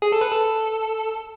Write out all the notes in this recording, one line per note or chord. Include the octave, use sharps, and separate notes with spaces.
G#4
A4
B4
A4